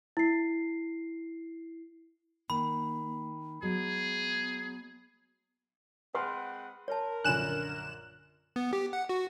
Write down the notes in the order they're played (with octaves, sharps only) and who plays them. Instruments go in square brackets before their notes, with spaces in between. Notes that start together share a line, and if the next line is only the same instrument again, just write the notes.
[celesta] E4 C7
[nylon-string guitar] D#3 [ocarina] A#3 [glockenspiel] B5
[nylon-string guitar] F#3 G#3 [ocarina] B3 [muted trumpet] G#4
[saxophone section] G#3 C4 F#5 [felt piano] B4 C6 F6
[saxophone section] A#4 [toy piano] C#5 A5
[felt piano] A#1 F#2 D3 [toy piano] F4 C#5 G#5 [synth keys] F#6 E7
[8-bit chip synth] B3
G4
F#5
F#4